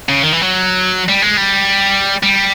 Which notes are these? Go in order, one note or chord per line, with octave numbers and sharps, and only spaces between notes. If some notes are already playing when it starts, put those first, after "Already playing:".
C#3
D#3
E3
F#3
G3
G#3
G3
G3